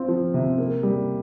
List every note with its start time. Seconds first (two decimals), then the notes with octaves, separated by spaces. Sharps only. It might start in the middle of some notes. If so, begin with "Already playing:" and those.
Already playing: C4 F4
0.08 F3
0.34 C3
0.58 A#3
0.83 G3